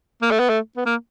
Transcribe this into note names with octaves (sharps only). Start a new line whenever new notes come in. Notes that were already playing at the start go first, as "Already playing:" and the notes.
A#3
A3
B3
A3
B3
A#3